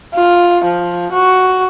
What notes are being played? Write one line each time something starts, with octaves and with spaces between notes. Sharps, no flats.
F4
F3
F#4